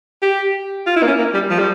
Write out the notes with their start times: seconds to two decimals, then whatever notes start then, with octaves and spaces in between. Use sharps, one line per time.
0.23 G4
0.87 F4
0.97 E4
1.03 A#3
1.07 C#4
1.19 A#3
1.34 G3
1.50 F3
1.59 G3